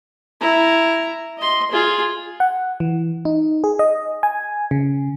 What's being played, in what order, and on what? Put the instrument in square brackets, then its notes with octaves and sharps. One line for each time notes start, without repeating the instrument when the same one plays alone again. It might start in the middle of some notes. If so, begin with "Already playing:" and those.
[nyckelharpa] E4 A#5
D#5 C6
F4 G#4
[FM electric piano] F#5
E3
D#4
G#4
D#5
G#5
C#3